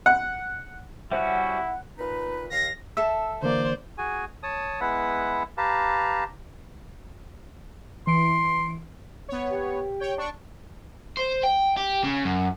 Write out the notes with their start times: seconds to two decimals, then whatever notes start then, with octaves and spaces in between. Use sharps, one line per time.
0.06 F#5
1.11 G3 C#4 E4 F#4 C5 E5 F#5
1.98 A#2 D#4 B4
2.50 D#2 D#3 F5 A#6
2.97 A4 E5 E6
3.42 D3 E3 A#3 C5 D5
3.98 F#4 G#4 G#5
4.43 C#5 A5 D#6
4.80 G#3 B3 E4 B4 E5 F#5
5.57 G4 B4 F5 A5 A#5
8.07 E3 C6 D7
9.28 B3 C#5
9.51 G4
10.00 C#5 G5
10.18 D4 C#6
11.17 C5
11.43 G5
11.77 G4
12.04 C#3
12.25 F#2